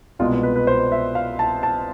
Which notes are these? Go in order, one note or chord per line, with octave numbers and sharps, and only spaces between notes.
C2 B2 G#3 F4
B4
B4
B4
C5
E5
F5
A5
A5